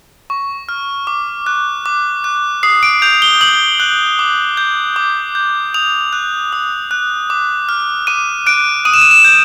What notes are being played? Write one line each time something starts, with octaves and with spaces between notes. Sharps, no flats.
C#6
F6
D6
F#6
D6
F#6
D#6 C7
D7
G6 F7
G7
D#6 F#7
F#6
D6
G6
D6
G6
D#6 F7
F#6
D#6
F#6
D6
F6
D6 D#7
F#6 D7
D#6 D#7
E7
D#7
E7
G6